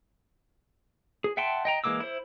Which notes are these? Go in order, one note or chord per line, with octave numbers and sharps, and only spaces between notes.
G#4
E5 F#5 G5 A5 C6
D#5 G5 A#5
E3 G#3 A#3 D6 E6
E4 C5